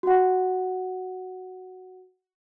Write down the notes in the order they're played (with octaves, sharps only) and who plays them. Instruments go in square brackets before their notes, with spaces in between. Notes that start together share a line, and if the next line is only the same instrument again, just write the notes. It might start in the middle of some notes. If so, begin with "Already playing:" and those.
[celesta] F#4 F#5